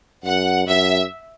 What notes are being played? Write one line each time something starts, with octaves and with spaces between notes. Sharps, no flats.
F#2 F#5
F#2 E5